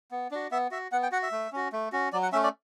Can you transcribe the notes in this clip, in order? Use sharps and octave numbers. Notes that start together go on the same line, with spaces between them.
B3
D4 F#4
B3 E5
F#4 E5
B3 F#5
G5
F#4 F#5
E5
A3
C#4 F#4
A3
C#4 F#4
F#3 D5
F#5
A3 C#4 E5
D5